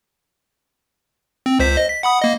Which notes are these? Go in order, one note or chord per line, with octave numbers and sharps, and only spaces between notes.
C4
C#2 C5 B6
D#5
B6
F#5 B5 D#6
A#3 D#5